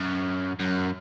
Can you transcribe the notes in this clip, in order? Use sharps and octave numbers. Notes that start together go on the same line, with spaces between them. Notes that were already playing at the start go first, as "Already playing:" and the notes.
Already playing: F#2
F#2